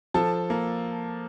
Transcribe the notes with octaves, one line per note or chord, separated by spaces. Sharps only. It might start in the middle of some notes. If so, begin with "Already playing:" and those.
F3 A4 A5
A#3